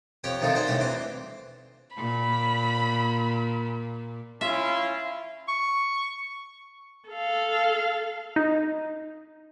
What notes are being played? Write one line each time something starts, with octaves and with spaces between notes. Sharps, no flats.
F2 G4 C#5 G5 D#6
C3 D#3 F3 D#4 F4 A4
F#4 C5 D5 G5 G#5
A2 D3 A3 G4 D#6
E3 C4 C6 D6
A#2 B5
C#4 E4 F4 E5
C#6
A4 F5
D#4